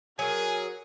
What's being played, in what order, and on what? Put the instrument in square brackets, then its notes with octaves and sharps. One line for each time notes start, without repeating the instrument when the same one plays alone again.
[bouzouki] F#3 [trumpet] G#4 [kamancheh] A#4 [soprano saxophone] G#5